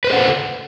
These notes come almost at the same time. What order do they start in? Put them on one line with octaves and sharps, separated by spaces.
B4 C5 G#4 F#5 A4